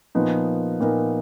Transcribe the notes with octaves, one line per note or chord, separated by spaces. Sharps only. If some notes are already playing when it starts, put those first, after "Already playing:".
A#2 F3 B3 D#4 A#4
A#2 F3 B3 D#4 A#4